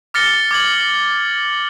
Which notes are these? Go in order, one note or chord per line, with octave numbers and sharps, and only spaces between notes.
D6 F6 A6 A#6 C#7 G7
D6 G#6 F#7